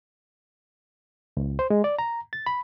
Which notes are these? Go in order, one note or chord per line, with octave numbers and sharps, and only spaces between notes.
C#2
C5
G#3
D5
A#5
A6
B5